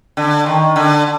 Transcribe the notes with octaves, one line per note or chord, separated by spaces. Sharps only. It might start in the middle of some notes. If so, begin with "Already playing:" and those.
D3
D#3
D3